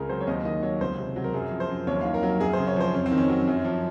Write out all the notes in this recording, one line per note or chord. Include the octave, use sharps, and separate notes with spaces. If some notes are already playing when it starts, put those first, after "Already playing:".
Already playing: C#2 C#3 G#4 A#4
F#3 C5
C#5
D#2 D#5
D#3 D#5
F#3 C#5
C#2 C5
C3
F#3
A#4
F#2 G#4
F3
C5
F#2
D#2 C#5
D#3 F5
A#4
F#3
F#2 G#4
C5
C#3
C#5
F3 C5
F2 C#4
C4
D#3
C#4
F#3
F#2
F3